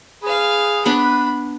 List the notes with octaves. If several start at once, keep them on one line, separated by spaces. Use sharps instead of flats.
G#4 B4 F5
B3 D4 B4 B5